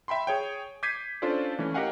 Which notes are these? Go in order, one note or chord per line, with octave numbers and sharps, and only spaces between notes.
E5 G5 B5 C6
G#4 C#5 G5
D6 G6 G#6 B6 C7 D#7
C#4 D4 F4 A4 C5 D5
E3 A3 C#4
G4 A#4 D#5 F5 F#5 G#5